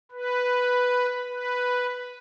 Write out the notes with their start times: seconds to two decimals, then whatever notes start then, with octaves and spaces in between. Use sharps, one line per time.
0.12 B4
1.28 B4